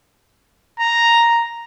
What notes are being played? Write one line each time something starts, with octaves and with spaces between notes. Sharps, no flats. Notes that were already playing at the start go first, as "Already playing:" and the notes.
A#5